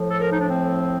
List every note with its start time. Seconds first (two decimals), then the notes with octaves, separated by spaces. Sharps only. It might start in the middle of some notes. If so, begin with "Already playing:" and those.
Already playing: A2 F3
0.10 A4
0.21 A#4
0.30 D#4
0.39 D4
0.48 C4